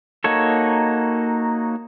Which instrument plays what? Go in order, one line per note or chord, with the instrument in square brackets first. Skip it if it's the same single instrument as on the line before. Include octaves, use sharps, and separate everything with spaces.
[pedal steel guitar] A#3 D#4 F#4 A4 C#5